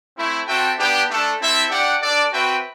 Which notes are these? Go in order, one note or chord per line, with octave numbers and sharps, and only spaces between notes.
A3 C4 E4
C4 F#4 A4 E5 G5
B3 D4 G4
A3 D4 A4
C4 E4 A4 E5
D4 G4 D5 F#5
D4 A4 D5
C4 F#4 B4 E5 G5